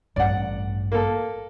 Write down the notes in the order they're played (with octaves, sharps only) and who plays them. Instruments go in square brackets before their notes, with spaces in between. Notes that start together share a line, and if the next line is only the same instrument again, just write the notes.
[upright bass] A1 G2 [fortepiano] D5 F#5
[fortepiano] A#3 A4